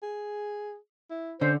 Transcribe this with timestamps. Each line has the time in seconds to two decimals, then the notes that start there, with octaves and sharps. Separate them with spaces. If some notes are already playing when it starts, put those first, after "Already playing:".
0.03 G#4
1.10 E4
1.41 D3 C#4 C5